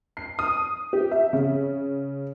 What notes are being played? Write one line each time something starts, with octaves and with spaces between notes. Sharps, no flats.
C7
D#6
G4
E5
C#3